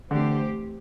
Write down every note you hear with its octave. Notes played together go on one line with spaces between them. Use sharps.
D3 E3 A3 C4 G4 C5